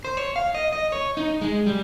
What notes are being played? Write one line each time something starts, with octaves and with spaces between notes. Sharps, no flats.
C5
C#5
F5
D#5
D#5
C#5
D#4
G#3
G3